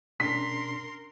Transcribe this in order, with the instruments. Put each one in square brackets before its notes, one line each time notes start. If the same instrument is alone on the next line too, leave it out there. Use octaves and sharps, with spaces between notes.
[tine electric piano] B2 C#4 D4 [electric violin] A#4 C6 [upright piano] B6